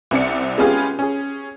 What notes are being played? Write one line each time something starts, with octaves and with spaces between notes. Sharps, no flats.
C2 C4 D5 C#7
G#3 B3 C#4 F4 G4 G#4
C#4 G#4